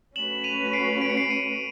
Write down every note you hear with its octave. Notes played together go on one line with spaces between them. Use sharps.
A3 C#4 F#4 B4 E7 F#7
D#7 F7
C7 D7
D7
C#7
C7 D7
C#7 D#7